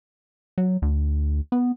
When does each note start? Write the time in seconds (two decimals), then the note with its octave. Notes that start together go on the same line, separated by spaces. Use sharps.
0.58 F#3
0.82 D2
1.52 B3